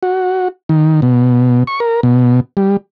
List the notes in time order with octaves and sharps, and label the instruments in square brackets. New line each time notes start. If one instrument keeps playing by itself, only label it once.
[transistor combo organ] F#4
D#3
B2
C#6
A#4
B2
G3